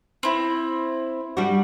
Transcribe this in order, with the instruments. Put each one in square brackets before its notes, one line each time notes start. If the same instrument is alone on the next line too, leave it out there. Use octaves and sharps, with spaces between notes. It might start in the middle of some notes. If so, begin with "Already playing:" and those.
[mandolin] C4 E4
[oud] G3 D4 F#4